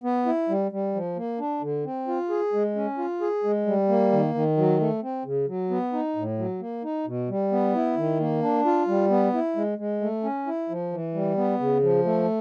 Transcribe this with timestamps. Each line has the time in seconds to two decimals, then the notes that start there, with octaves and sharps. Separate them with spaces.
0.04 B3
0.26 E4
0.49 G3
0.71 G3
0.95 F3
1.16 A#3
1.39 D4
1.62 D3
1.85 C4
2.08 F4
2.30 G#4
2.53 G#3
2.76 C#4
2.98 F4
3.21 G#4
3.44 G#3
3.66 G3
3.89 A#3
4.12 D#3
4.35 D#3
4.57 F#3
4.80 A3
5.03 C4
5.25 C#3
5.48 F#3
5.70 B3
5.93 D#4
6.16 A2
6.39 F#3
6.61 A#3
6.84 D#4
7.07 B2
7.29 G3
7.52 B3
7.75 E4
7.97 D#3
8.20 A#3
8.42 D4
8.65 F4
8.88 G3
9.10 B3
9.33 E4
9.56 G#3
9.78 G#3
10.01 A3
10.23 C#4
10.47 E4
10.69 F3
10.92 E3
11.14 G3
11.37 B3
11.60 C#3
11.83 F3
12.05 A3